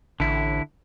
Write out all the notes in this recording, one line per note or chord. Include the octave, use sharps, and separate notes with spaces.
A1 D3 E4